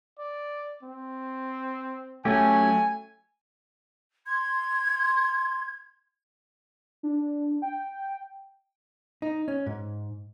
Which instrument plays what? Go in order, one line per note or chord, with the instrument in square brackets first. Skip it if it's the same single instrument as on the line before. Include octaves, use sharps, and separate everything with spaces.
[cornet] D5
C4
[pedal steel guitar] F#3 C#4 G4 [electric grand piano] A3 [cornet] G#5
[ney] C6 [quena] G#6
[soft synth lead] D4
G5
[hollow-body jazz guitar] D#4
C#4
G#2